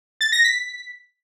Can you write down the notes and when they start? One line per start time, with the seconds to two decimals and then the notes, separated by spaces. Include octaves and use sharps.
0.21 A6
0.32 A#6
0.44 B6